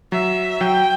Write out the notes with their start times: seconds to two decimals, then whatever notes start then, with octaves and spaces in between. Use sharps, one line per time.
0.12 F#3 E5
0.61 F#3 G5